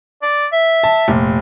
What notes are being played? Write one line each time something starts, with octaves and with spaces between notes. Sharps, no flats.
D5
E5
A5
F1 A#2